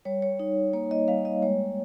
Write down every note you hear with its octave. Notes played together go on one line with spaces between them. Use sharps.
G3 C#5
C#5
D#4
A#3 C#5
D#5
G3 F5
D#5
G#3 C#5